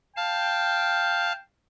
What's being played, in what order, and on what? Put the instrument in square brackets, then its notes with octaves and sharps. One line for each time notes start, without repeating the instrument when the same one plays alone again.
[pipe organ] F5 A5 F6 [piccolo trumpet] G5